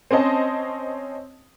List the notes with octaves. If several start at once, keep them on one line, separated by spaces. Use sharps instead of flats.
C4 C#4 C5 D#5 A5